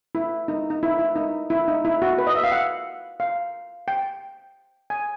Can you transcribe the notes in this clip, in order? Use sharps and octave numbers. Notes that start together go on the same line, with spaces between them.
E4
D#4
D#4
E4
E4
D#4
E4
D#4
E4
F#4
B4
D#5
E5
F5
F#5
F5
G5
G#5